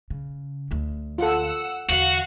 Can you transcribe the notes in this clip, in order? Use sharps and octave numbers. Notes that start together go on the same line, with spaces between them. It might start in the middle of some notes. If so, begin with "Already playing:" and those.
C#3
D2
F4 A4 F#5 E6
E2 D3 F#4 F5 F#5